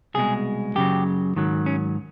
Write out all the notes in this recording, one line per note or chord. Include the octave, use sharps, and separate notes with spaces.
C2 B2 G#3 G#4
F#2 C#3 F#3 G4
G#2 D#3 F#3
C#4